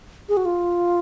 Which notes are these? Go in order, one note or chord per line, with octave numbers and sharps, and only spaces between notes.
G#4
F#4
F4